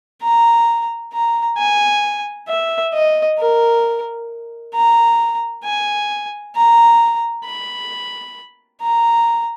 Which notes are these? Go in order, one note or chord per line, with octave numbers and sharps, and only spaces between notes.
A#5
A#5
G#5
E5
D#5
A#4
A#5
G#5
A#5
B5
A#5